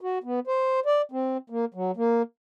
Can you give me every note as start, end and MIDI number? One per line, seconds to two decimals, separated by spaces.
0.01 0.19 66
0.24 0.40 59
0.47 0.80 72
0.86 1.02 74
1.12 1.37 60
1.50 1.65 58
1.74 1.91 54
1.97 2.22 58